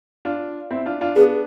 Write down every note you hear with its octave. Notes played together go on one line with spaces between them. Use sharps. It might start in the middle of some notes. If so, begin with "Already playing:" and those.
D4 F4
C4 E4
D4 F4
D4 F4
B3 D4 G#4